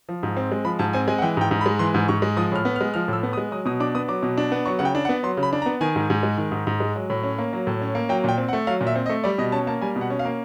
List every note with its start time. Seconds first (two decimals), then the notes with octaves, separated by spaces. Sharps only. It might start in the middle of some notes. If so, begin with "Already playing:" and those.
0.09 F3
0.23 G#2
0.37 C4
0.52 G#3
0.65 F3 B5
0.79 G#2 A5
0.93 C4 G#5
1.08 G#3 G#5
1.18 F#5
1.22 E3 G5
1.37 G#2 G5
1.51 G#2
1.61 B5
1.66 G#3
1.79 E3 C6
1.94 G#2
2.08 G#2 C#6
2.22 G#3
2.37 F3 D#6
2.52 A2 F6
2.65 B3
2.76 F6
2.81 G#3
2.94 F3 F6
3.08 A2 E6
3.23 B3
3.33 D#6
3.37 G#3
3.51 F#3 D#6
3.65 B2 D#6
3.80 D4 D6
3.95 B3 D#6
4.08 F#3 D6
4.23 B2
4.37 D4
4.52 B3
4.66 F#3 C#6
4.79 C#3 F#5
4.85 G5
4.95 D4
5.05 F#5
5.09 B3
5.23 F#3 C6
5.37 C#3
5.43 B5
5.53 D4
5.62 A#5
5.66 B3
5.81 D#3 G#5
5.96 G#2
6.10 G#2
6.23 G#3
6.38 D#3
6.52 G#2
6.67 G#2
6.80 G#3
6.96 F#3
7.10 A2
7.23 C#4
7.38 A#3
7.53 F#3
7.67 A2
7.82 C#4
7.95 A#3
8.09 F#3 G5
8.24 A#2 G5
8.38 C4
8.48 F#5
8.53 A3
8.67 F#3 F5
8.81 A#2
8.87 E5
8.96 C4
9.06 D#5
9.09 A3
9.24 G3 D5
9.38 B2 D#5
9.52 C#4 A5
9.67 A#3 A5
9.81 G3 G#5
9.96 B2
10.01 F#5
10.10 C#4
10.19 F5
10.25 A#3